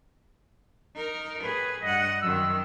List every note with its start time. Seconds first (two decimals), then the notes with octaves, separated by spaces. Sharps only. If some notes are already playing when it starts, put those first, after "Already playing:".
0.96 D#4 A#4
1.43 A2 G#4 B4
1.82 G2 D#5 F#5
2.22 F#2 D#3 E6